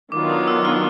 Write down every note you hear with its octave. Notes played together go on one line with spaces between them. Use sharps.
D#3 F#3 B3 D4 F4 D6
D#6
E6
F6